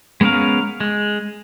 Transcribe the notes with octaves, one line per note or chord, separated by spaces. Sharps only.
G#3 B3 C#4 A#4 F5
G#3